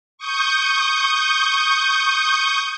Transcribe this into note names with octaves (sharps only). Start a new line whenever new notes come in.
C#6 D#6 G6